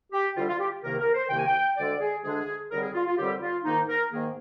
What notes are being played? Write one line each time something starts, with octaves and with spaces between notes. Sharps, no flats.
G4
D2 D3 G3 F4
F4
G4
C2 C3 D#3 A#3 A#4
A#4
C5
C2 C3 D#3 A#3 G5
G#5
G5
D2 D3 G#3 D4 D5
G#4
D2 D3 G#3 D4 G#4
D#2 D3 G3 C4 A#4
G#4
F4
F4
D#2 D3 G3 C4 G4
F4
G#2 D#3 A#3 D#4
A#4
G#2 D#3 A#3 G#4